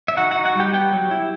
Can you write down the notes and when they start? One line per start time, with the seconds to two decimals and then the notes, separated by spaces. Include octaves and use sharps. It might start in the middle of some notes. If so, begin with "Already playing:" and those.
0.08 E5
0.17 D#4 F#4 F#5
0.31 D#4 F#4 F#5
0.45 F#4 F#5
0.55 G3 G4 G5
0.73 B3 G4 G5
0.93 F#3
1.11 E4